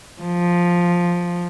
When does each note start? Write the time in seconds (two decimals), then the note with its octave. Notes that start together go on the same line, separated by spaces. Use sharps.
0.22 F3